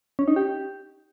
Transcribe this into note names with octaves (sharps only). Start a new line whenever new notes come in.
C#4
D#4
G4